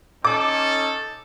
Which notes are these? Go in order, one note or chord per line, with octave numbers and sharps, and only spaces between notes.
C#4 D#4 A4 D6